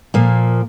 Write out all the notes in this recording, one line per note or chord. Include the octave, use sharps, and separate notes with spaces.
A#2 F3 A#3